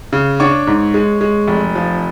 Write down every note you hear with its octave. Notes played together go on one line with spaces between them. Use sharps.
C#3
D4 C#5 C#6
G#2
G#3
G#3
F1
F3